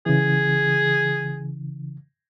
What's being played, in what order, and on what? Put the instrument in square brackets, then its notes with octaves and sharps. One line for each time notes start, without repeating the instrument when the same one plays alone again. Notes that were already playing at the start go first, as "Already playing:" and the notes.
[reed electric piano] C#3 E3 [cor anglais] G#4